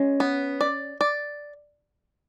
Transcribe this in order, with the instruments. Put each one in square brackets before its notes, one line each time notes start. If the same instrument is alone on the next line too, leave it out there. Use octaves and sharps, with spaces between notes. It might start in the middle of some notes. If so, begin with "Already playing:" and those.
Already playing: [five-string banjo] G#3 [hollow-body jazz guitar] C#4
[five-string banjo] B3
D5
D5